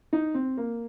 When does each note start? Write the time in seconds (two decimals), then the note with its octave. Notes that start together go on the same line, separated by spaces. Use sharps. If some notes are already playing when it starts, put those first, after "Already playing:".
0.13 D#4
0.34 C4
0.57 A#3